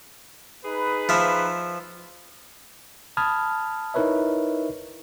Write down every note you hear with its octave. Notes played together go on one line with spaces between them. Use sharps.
D#4 G#4 B4
F3 E5
A5 B5 D#6 F6 G#6
D#4 E4 A#4 B4 C#5 E5